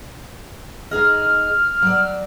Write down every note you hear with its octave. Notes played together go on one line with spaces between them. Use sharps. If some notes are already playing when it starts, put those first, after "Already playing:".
D#4 G#4 D#5 F6
F#3 D5